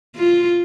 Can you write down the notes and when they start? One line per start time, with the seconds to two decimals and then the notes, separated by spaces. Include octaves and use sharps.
0.16 F4